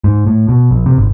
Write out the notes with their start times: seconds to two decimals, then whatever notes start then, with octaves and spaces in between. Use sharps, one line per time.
0.04 G#2
0.27 A2
0.49 B2
0.71 A#1
0.86 C3
0.98 G#1